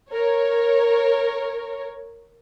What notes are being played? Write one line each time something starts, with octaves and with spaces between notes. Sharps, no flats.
A#4 C#5